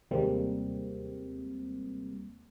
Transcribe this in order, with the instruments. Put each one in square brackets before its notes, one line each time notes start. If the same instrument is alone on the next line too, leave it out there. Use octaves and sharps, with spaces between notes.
[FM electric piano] D#2 C3 G3 G#3 A#3 C4